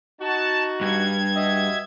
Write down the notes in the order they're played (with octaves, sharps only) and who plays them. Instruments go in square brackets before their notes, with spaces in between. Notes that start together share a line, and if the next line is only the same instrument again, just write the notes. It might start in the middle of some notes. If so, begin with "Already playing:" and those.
[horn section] D#4 F#4 [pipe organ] A5
[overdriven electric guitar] G2 [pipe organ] G#6
[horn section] F#4 D#5 E5